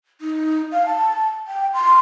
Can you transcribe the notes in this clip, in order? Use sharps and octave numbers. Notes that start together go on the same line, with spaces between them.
D#4
F5
A5
G5
C6